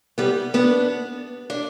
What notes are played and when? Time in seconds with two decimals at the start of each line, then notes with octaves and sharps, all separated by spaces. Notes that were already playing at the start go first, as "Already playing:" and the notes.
0.18 G3 B3
0.54 B3 D4
1.50 D4